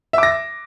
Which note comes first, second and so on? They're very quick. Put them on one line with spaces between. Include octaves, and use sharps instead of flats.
E5 D6 A#6